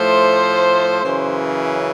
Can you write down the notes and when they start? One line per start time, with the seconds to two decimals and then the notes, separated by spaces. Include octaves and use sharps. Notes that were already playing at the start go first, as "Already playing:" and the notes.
Already playing: A2 F3 A3 C5
1.00 F#2 C#3 E3